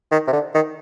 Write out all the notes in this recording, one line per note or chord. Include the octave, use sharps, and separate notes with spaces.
D#3
C3
D3
D#3